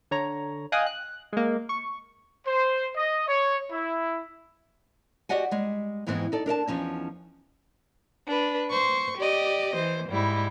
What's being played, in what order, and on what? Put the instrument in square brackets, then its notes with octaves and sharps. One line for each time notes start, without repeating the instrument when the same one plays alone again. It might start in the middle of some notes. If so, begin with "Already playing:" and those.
[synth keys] D3 C#5 A#5
D#5 F5 G5 G#5 D#6 F#6
F#6
G#3 A#3
C#6
[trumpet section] C5
D#5
C#5
E4
[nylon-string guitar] F#4 G4 D5 D#5 F#5 G#5
G3 G#3
F2 G#2 E3 G#3 B3 C4
D#4 A4 D5
D4 A#4 D#5 A5
E2 F3 C#4 D#4
[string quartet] D4 B4
C5 C#6
G4 D5 D#5
E3 C5
G#2 G3 E4